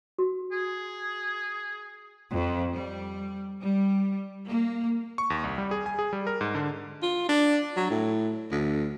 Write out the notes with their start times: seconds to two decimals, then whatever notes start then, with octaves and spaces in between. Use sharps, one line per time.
0.18 F#4
0.52 G#4
2.33 F2
2.74 G3
3.61 G3
4.47 A#3
5.18 C#6
5.30 D#2
5.44 C2
5.58 G3
5.71 G#4
5.86 G#5
5.99 G#4
6.13 G3
6.27 A#4
6.41 G#2
6.55 D3
7.03 F4
7.29 D4
7.76 F#3
7.90 A2
8.52 D2